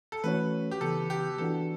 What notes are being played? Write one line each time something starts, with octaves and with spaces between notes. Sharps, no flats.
A4
E3 A3 C#4 F#4 B4 C#5
G4
C#3 E3 B3 A4
G4
E3 B3 D4 F#4 A4